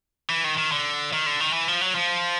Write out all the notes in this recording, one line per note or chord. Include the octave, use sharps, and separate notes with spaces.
E3
D#3
D#3
D3
D#3
D3
D#3
E3
F3
F#3
F3